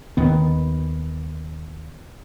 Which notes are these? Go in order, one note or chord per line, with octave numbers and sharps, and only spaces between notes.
D#2 D#3 B3